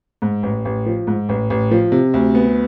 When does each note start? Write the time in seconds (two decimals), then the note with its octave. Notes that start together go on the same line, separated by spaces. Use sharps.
0.22 G#2
0.43 A1
0.65 A1
0.86 F3
1.07 G#2
1.29 A1
1.50 A1
1.71 F3
1.92 C3
2.14 D2
2.35 B3